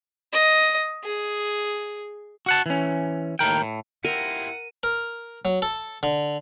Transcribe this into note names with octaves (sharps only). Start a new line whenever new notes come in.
D#5
G#4
F#4 F#5 A5
E3 C#4
D#2 A2 A#4 G5
A2
E4 F4 G4 A#4 F#5 D#7
A#4
F#3
A4
D3